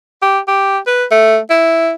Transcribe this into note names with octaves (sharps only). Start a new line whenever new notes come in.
G4
G4
B4
A3
E4